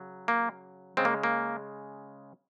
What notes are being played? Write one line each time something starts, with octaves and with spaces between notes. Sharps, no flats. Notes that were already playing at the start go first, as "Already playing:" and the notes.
Already playing: C#3 F#3
A#3
C#3 G#3 C4
A#3
A#3